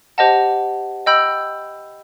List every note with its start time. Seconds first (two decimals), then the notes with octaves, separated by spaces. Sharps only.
0.18 G4 C5 D#5 F#5 A5
1.06 D#5 G5 B5 E6 G6